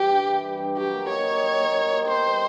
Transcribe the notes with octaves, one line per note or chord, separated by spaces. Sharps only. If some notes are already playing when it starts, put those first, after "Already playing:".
Already playing: E3 G3 G4
G2
E3
G3
G2
F#3 G4
A#3
D#4 C#5
G4
F#3
A#3
D#4
G4
B2 C5
G3